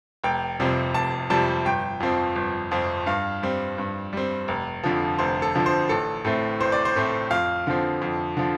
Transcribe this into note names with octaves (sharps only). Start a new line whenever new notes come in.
F1 G5
F2 C3 G3 C4
F1 A5
F2 C3 G3 C4 A5
G1 G5
F2 F3 C4
G1
F2 F3 C4
G2 F5
G3 C4
G2
G3 C4
F1
F2 D3 F3
F1 C5
A4
F2 D3 F3
C5
A1 A4
A2 A3 C4
A1 C5
D5
C5
A2 A3 C4
F2 F5
D3 F3 C4
F2
D3 F3